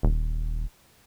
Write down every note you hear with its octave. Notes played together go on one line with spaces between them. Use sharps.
D#1